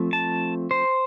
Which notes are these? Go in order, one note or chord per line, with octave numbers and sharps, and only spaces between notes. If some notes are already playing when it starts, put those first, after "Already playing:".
Already playing: F3 A3 C4
A5
C5